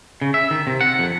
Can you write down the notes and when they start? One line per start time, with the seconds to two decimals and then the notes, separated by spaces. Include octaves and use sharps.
0.21 C#3
0.34 E5
0.51 D#3
0.67 C3
0.81 F#5
0.99 F2